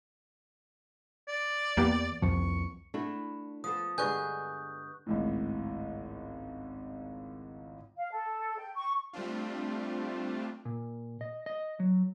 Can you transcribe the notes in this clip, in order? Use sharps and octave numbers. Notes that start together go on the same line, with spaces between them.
D5
E2 A#3 B3 G4
C2 F2 F3 C#6
A3 D4 E4 F#4
F3 B3 A4 D#6
G2 D3 G#3 B4 G#5 C#6 F#6 G6
G#1 C#2 A2
F5
A4
G5
C#6
G3 A3 C4 D4 F4
A#2
D#5
D#5
F#3